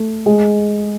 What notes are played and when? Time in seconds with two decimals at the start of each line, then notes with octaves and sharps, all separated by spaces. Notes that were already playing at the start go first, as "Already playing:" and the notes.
Already playing: A3
0.26 G#3